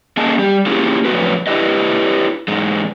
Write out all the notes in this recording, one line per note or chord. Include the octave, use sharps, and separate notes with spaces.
A#3 C#4 G#4 D#5 G#5 A5
G3 G4
A#3 C#4 E4 F4 G4 G#4
F2 A2 C3 F#3 F#4 B4
D4 E4 G4 B4 D#5
E2 G#2 G#3